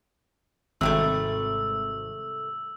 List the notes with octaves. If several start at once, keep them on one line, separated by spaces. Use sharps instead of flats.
G#1 C3 G3 A3 E6